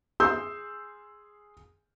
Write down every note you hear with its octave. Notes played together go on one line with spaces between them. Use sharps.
G#4 C6 E6 G6